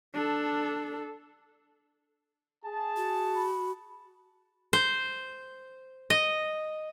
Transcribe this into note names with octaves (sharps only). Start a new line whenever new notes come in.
D4 A4
G#4 A5
F#4
B5
C5
D#5